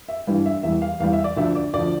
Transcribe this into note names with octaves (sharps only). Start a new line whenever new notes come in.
E5
G2 E3 G3 F5
E5
E2 E3 G3 E5
F5
E2 E3 G3 F5
E5
D5
D2 D3 F3 E5
D5
D2 D3 F3 D5